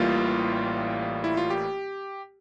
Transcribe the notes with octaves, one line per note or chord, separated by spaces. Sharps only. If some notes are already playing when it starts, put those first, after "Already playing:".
Already playing: A1 A2 E3 G3 A#3 F4
E4
F4
G4